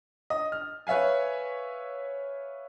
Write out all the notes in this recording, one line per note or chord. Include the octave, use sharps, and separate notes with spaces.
D#5
F6
B4 C#5 E5 F5 G#5